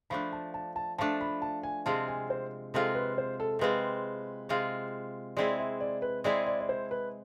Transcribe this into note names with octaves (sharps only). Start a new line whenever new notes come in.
F3 A3 D4 B5
A5
A5
A5
F3 A3 D4 A5
B5
A5
G#5
C3 G#3 C4 F4 A5
G#5
C5
C3 G#3 C4 F4 A4
B4
C5
A4
C3 G#3 C4 F4 B4
C3 G#3 C4 F4
G#3 C4 E4 G#4 D5
E5
D5
B4
G#3 C4 E4 G#4 D5
D5
D5
C5
B4